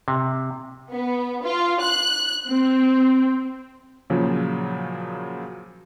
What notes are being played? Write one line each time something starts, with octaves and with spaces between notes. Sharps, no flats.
C3
B3
F4
F#6
C4
A#2 C#3 F3 F#3